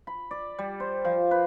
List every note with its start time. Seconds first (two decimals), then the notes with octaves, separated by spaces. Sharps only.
0.07 B5
0.31 D5
0.59 G3
0.80 C5
1.05 F3
1.31 B4